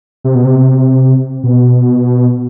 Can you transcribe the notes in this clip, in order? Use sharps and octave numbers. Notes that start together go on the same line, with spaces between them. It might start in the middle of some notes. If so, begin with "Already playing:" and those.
C3
B2
C3
B2